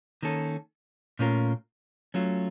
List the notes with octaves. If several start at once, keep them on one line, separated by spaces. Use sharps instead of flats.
D#3 A#3 C#4 A4
A#2 A3 C#4 F4 A#4
F#3 A3 C#4 F4